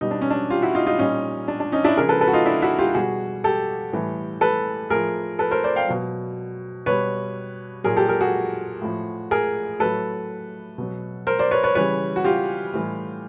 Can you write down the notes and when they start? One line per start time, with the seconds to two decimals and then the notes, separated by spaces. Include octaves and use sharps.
0.01 B2 G3 D#4
0.11 D4
0.21 C#4
0.31 D4
0.50 F4 G4
0.62 E4 F#4
0.75 D#4 F4
0.87 D#4 F4
0.99 A#2 G3 C#4 D#4
1.48 D4
1.60 D4
1.72 C#4 D#4
1.84 D4 E4
1.97 C#3 F3 G#4 A#4
2.09 A4 B4
2.21 A4 B4
2.28 F#4
2.33 D#4 F4
2.46 D4 E4
2.62 E4 F#4
2.79 F4 G4
2.95 B2 G3 F#4 G#4
3.44 G4 A4
3.93 A2 E3 G3
4.41 A4 B4
4.90 A2 F3 G#4 A#4
5.39 A4 B4
5.51 A#4 C5
5.64 C5 D5
5.76 F5 G5
5.88 B2 F#3
6.86 B2 G3 B4 C#5
7.84 A#2 F#3 G#4 A#4
7.97 G4 A4
8.08 G#4 A#4
8.21 F#4 G#4
8.82 A2 F3
9.31 G#4 A#4
9.79 A2 F#3 A4 B4
10.78 B2 F#3
11.27 A#4 C5
11.39 C5 D5
11.51 B4 C#5
11.63 B4 C#5
11.75 C#3 E3 G3 B4 C#5
12.16 F#4
12.24 F4 G4
12.74 A2 E3 G3